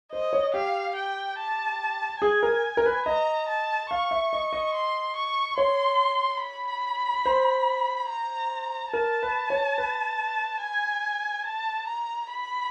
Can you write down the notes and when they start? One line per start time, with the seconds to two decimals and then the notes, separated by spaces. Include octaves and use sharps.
0.12 C5 D#5
0.33 C#5
0.54 G4 F5
0.96 G5
1.38 A5
2.22 G#4 G#5
2.43 A#4
2.77 A#4
2.86 B4
3.06 D#5 A#5
3.49 A5
3.91 F5 C#6
4.11 E5
4.33 D#5
4.53 D#5
4.74 C6
5.16 C#6
5.58 C#5 C6
6.42 B5
7.26 C5
8.10 A#5
8.93 A#4 A5
9.23 B4
9.50 C#5
9.78 B4
10.62 G#5
11.46 A5
11.87 A#5
12.30 B5